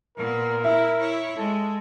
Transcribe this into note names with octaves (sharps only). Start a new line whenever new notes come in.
A#2 B3 A#4
E4 E5
E4 C#5
G#3 A4